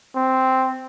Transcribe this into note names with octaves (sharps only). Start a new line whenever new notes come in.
C4